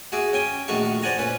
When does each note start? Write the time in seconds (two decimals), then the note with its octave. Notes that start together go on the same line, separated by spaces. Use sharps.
0.12 F#4 G#4 E5 D6
0.33 C#4 G5 G#5
0.68 A#1 D#3 A3 F#4 E5 C#6
1.02 C5 D5 F#5 G#5 A#5
1.18 A#2 C#4 B4